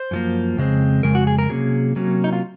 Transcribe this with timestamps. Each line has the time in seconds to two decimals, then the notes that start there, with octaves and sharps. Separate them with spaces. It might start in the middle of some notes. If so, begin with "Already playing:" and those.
Already playing: C5
0.11 F#2 F3 A#3
0.57 F2 C#3 G#3 C4
1.03 F2 C#3 G#3 A#4
1.15 F#4
1.27 G#4
1.39 A#4
1.50 C3 F#3 A#3 C#4 G#4
1.96 C3 F#3 A#3 C#4
2.24 D#4
2.33 F4